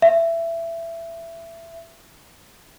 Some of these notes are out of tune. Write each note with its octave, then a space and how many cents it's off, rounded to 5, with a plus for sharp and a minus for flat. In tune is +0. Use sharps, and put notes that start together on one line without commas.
E5 +20